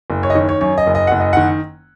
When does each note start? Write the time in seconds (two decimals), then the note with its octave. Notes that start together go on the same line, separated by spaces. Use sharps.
0.10 F#1
0.23 C#5
0.30 D#5
0.35 D#3 C#5
0.49 C#5
0.61 F#2 C#5
0.78 D#5
0.87 F#1
0.95 D#5
1.07 F#1 F#5
1.20 D#5
1.33 D#3 F#5